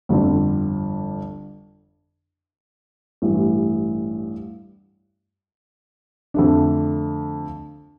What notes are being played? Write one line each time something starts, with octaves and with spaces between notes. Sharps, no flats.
G1 F2 D3
A1 G2 E3
F2 D3 A3 D4